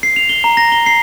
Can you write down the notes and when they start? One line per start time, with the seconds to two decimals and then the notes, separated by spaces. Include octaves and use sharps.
0.03 C7
0.16 F7
0.29 G7
0.44 A#5
0.57 A#6
0.72 G7
0.86 C7